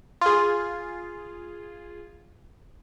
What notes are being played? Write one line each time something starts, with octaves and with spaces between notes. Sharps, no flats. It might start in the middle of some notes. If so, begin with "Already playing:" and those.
F4 G#4